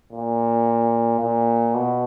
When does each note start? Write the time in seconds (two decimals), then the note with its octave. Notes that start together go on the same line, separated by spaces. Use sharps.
0.13 A#2
1.20 A#2
1.75 B2